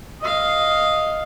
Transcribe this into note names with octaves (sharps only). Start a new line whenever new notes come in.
D#5 F5